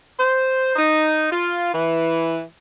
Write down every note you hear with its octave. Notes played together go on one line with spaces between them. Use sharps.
C5
D#4
F4
E3